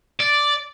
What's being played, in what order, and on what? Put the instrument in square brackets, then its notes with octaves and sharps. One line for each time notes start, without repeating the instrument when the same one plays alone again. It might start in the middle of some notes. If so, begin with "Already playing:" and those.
[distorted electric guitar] D5